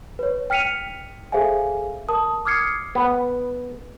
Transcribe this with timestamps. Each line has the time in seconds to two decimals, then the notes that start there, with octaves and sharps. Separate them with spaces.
0.19 B4 C#5
0.50 G5 F6 B6 C#7 D#7 F7
1.32 G#4 A4 C5 E5 F5 G#5
2.09 A#4 A5 D#6
2.45 D6 D#6 F6 G#6 C7 C#7
2.95 B3